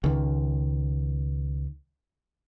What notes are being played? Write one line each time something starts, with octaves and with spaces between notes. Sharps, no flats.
C#2 D#3